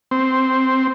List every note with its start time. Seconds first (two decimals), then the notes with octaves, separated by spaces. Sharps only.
0.11 C4